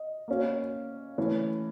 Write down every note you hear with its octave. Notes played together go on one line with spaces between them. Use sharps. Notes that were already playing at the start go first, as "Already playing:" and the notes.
Already playing: D#5
A#3 C#4 F#4
E3 A3 C#4